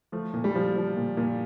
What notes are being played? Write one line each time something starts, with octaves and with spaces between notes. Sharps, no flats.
F3 A3
A#2
G3
F3
F3
A#2
A#2